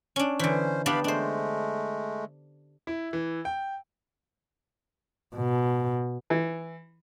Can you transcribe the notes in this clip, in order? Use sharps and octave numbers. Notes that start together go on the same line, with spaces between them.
C#4 D4
D3 E3 C#4 C5
B3 D4 G4 D5 F5 B5
G#3 A3 D4 C5
E4
E3
G5
B2
E3